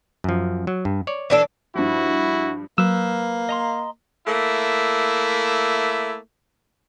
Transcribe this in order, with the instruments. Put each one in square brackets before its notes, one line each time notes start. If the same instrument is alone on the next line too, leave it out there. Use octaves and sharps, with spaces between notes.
[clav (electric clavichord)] F#2 F3
F#3
G2
C#5 D5
[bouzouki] E3 D4 A4
[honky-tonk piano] G2 F3 [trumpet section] E4 F#4
[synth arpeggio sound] F#3 [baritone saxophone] A#3 [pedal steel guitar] B4 E6
[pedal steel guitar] D#5 A#5 C6
[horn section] A3 A#3 E4